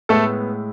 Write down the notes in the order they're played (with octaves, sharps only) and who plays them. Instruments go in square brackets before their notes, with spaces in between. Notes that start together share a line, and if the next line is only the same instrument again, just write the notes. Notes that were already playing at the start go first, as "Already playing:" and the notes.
[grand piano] A2 G#3 A3 B3 A4